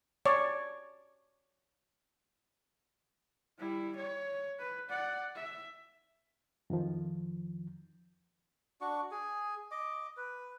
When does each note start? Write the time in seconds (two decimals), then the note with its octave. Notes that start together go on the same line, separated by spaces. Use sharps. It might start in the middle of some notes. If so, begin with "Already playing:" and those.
0.25 C#5 D5
3.59 G3 E4
3.96 C#5
4.59 B4
4.90 D5 F#5
5.36 E5
6.70 F2 D#3 F3
8.81 D4 F#4 C#6
9.11 G#4
9.71 D#5 D6
10.17 B4